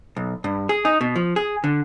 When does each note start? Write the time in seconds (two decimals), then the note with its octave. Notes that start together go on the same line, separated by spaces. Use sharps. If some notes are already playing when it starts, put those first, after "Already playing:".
0.16 B1
0.44 G2
0.69 G#4
0.85 D#4
1.01 B2
1.16 F3
1.36 G#4
1.64 D3